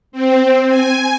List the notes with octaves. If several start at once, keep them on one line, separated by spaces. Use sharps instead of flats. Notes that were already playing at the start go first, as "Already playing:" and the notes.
C4
G#5